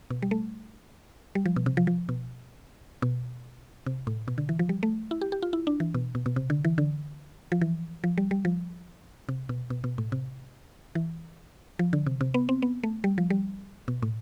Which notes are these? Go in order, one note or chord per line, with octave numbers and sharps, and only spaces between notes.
B2
G3
A3
G3
F3
B2
C3
F3
F3
B2
B2
C3
A2
B2
D3
E3
F3
G3
A3
E4
G4
G4
F4
E4
D4
E3
B2
B2
B2
C3
D3
E3
D3
F3
E3
F3
G3
G3
F3
C3
B2
B2
B2
A2
C3
E3
F3
D3
C3
C3
B3
C4
B3
A3
G3
F3
G3
B2
A2